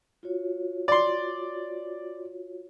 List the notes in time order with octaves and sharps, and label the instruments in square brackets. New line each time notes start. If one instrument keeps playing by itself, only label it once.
[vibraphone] F4 F#4 C#5
[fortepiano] D5 C6